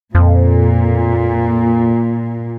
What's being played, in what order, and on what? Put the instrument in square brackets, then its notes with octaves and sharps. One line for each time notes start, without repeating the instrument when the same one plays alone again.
[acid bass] F2 [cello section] A#2